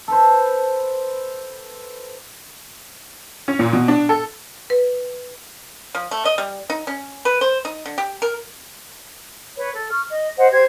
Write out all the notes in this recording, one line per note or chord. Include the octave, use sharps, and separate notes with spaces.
A4 B4 C5
C#4
A#2
B2
D4
A4
B4
F3
A3
D#5
G3
D#4
C#4
B4
C5
D#4
D3
G4
A#4
B4 C#5
A4
C#6 F6
D#5
C5 D#5 F#5
G4 C5 G#6